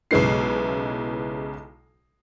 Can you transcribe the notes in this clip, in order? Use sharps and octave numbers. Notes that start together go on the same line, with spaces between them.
B1 C#3 G#3 B3 E4 C7